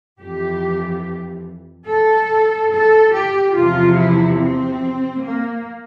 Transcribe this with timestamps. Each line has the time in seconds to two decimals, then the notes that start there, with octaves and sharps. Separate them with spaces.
0.20 F2 E3 G4
1.87 A4
2.70 A4
3.12 G4
3.54 E2 C3 F3 F4
3.95 E4
4.37 C4
5.21 A#3